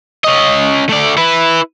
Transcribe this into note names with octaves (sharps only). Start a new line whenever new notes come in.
C#4 D#5
A3 D5
E4 B4